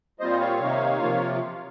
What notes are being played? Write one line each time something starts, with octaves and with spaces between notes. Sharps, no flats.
A#2 G3 C4 F4 C5 D#5
C#5 F5
C3 D#3 A#3 D#4
C3 F3 A#3 F4